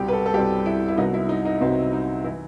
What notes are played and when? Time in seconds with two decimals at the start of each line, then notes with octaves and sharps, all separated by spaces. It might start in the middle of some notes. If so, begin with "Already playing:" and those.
Already playing: C2 B2 G3 C4 G4
0.08 B4
0.13 A4
0.26 A4
0.34 C2 B2 G3 C4 G4
0.66 E4
0.88 E4
0.97 C2 C3 F#3 B3 D#4
1.14 E4
1.29 D#4
1.45 D#4
1.61 C2 C3 F#3 B3 C4
1.93 D#4
2.24 E3 E4